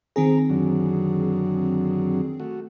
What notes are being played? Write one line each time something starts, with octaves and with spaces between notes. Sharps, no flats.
D#3 C4 G#4 A#5
F#2 D3 F#3
A3 F#4